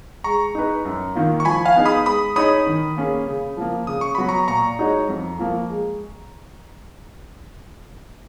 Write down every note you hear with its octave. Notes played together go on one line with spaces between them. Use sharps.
G#3 A#5 C#6
D#4 G#4 B4
F#2
D#3 A#3 F4
C#6
F3 G#5 B5
F5 G#5
B3 D#4 G#4
B5 D#6
G#3 B5 D#6
D#4 G#4 C#5 B5 D#6
D#3
A#3 C#4 G#4
C#3
F3 A#3
C#3 D#6
C#6
F#3 B3 F#4 B5
A#5 C#6
A#2 A#5 C#6
G#3 D#4 F#4 C#5
F2
F3 A#3
G#3